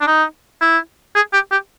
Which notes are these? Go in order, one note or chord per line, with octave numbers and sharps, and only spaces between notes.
D4
D#4
E4
G#4
G4
G4